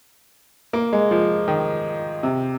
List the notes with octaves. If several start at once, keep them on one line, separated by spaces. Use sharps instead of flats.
A#3
G#3
F3
D#3
C3